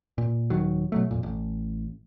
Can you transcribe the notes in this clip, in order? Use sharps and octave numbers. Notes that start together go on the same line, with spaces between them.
A#2
D#1 D2 D#3 F#3
B2 F#3 A3
F2 A#2
A1